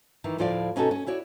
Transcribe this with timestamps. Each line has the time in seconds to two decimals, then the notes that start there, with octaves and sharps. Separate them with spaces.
0.24 D#3 E3
0.38 D2 A2 F3 F4 F#4 D5
0.76 B2 C#4 D#4 F#4 A4
0.91 C#4
1.07 E4 F#4 C#5 D5